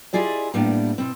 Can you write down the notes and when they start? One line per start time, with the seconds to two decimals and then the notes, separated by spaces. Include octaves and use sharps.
0.13 E4 F4 G4 G#4 D5 D#5
0.54 A2 G3 A#3 B3 D4
0.98 B2 C4